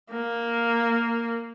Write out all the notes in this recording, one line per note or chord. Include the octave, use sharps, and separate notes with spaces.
A#3